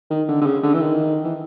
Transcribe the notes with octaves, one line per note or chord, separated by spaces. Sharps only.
D#3
D3
D3
C#3
D3
E3
D#3
E3